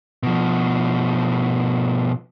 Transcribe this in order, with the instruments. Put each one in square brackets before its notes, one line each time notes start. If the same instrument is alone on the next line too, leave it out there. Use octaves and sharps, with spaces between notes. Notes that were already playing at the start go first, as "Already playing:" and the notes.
[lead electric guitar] B2 F3